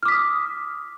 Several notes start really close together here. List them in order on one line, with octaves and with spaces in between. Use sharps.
F6 D6 B6 D#6